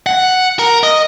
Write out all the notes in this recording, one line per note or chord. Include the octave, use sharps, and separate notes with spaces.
F#5
A#4
D#5